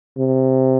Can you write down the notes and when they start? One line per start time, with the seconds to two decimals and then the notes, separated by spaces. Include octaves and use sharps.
0.18 C3